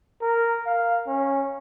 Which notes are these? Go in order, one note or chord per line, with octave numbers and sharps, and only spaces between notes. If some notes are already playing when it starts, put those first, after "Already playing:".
A#4
F5
C#4